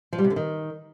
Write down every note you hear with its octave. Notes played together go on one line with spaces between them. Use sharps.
F3
G3
C3
D3
D#3